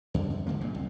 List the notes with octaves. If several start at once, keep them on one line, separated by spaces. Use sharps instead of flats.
E2 G2 D3
F#2
F#1 G#2 D3 A#3
A#1 E2 A#2
C2